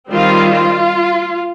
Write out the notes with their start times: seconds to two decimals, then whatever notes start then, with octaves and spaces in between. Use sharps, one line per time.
0.11 D#3 G3 C4 F4
0.51 F4